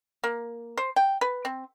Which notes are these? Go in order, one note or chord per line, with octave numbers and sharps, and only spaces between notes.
A#3
C5
G5
B4
C4